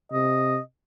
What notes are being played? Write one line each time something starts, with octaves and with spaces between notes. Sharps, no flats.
C3 D#5